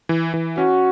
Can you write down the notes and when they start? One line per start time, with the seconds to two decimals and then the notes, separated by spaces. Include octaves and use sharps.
0.09 E3
0.34 E3
0.58 C#4 F#4